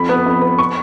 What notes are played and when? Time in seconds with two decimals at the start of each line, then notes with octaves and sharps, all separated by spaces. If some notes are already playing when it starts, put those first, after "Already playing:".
Already playing: F2 B5
0.09 B3
0.26 F2
0.42 B3
0.59 C#6